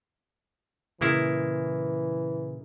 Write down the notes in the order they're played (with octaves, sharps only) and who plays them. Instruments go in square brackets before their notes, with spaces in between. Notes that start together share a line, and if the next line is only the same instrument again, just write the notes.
[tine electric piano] A#2 [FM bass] C#3 [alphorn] E3 [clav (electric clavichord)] G#3 A#3 E4